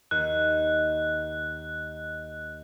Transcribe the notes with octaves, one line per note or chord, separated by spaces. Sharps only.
D#2 F#6